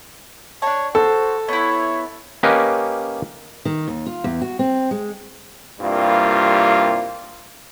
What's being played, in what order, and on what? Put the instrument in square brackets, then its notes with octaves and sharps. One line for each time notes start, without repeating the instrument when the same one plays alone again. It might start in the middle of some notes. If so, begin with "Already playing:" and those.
[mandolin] D4 A5 [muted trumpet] C#5
[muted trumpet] F#4 [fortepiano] A4 [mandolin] C5
[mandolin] B3 E4 [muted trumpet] C#5
[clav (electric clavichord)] A#3 C#4 G4 B4 D#5
[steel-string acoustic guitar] D#3
D#2
F4
E2
F#4
C4
G#3
[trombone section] C2 G2 G3 A#3 F4